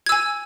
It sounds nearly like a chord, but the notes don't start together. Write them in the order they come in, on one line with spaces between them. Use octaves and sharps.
G#6 E6 G#5